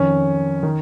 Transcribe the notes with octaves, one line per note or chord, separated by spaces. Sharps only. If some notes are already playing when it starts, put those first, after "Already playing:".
Already playing: F2 D#3 C#4
D#3